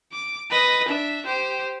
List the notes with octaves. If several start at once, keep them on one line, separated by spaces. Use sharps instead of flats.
D6
B4 D#5
D4 E5
G4 C5